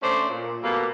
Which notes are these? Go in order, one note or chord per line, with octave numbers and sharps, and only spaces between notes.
A3 C#4 D4 C5 D5
A#2
B2 G3 A3 A#3